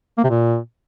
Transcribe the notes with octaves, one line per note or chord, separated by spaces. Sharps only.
A#3
C3
A#2